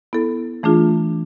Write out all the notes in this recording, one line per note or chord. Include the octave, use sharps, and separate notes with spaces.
B3 E4 A4
E3 A3 D4 F4 G#4